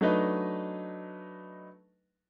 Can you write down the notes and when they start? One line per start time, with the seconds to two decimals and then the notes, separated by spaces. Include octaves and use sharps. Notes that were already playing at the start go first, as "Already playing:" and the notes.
0.01 F#3 A3 D4 D#4 B4 D#5